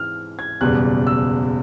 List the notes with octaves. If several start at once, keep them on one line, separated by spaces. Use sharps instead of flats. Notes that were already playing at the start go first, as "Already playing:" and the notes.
Already playing: G#2 E3 G#3 C4 F6
G#6
F#1 E2 B2 G3 F#6
E6